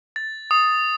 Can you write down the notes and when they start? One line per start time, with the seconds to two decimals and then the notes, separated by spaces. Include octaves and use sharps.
0.16 A6
0.51 D#6